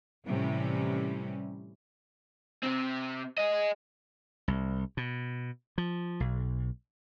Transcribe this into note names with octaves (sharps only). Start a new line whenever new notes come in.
A2 C3 E3 G3 C#4
C3 C4
G#4 D#5
C2
B2
F3
B1